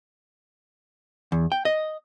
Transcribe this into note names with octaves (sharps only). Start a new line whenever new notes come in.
E2
G5
D#5